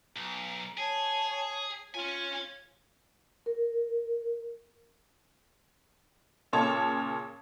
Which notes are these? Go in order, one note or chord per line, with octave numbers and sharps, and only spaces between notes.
B1 A#5
G#4 C#5 G#5 A5
C#4 F4 C#5 G#5
A#4
A#2 C#3 C#5 A5